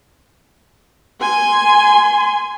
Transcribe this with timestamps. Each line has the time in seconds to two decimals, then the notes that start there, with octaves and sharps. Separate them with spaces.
1.22 G#5 C6